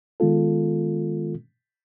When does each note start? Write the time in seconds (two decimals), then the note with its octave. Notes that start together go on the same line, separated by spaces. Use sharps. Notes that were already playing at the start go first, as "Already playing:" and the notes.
0.20 D#3 G#3 B3 F4 A4